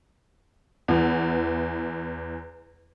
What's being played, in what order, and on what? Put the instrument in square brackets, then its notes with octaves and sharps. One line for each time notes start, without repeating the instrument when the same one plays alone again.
[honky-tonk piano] E2 E3